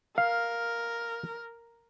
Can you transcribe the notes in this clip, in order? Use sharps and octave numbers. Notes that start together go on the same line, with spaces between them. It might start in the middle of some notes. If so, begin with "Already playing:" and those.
A#4 F5